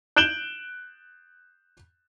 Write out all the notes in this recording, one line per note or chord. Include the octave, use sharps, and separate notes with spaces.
F#6 G6 D7 E7 F#7 G7